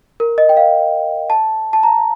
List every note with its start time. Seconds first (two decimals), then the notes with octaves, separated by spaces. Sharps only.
0.20 A#4
0.38 D#5
0.49 G5
0.57 F5
1.30 A5
1.73 A5
1.83 A#5